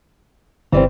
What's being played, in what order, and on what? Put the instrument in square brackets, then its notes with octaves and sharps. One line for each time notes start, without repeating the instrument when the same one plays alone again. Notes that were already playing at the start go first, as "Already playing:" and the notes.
[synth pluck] G1 [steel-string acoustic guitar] E3 G3 C4